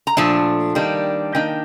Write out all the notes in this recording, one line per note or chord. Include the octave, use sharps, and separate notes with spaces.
A#5
A#2 F3 A3 D4 A5
D#3 G3 A#3 D4
D#3 A#3 D4 G5